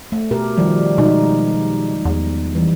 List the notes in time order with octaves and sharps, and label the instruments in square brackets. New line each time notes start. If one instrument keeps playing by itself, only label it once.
[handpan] A3
B2 G4 A#4
D#3 F3 G3
[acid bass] B2 [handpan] G#3 D#4
[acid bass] E2
[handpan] E3 G3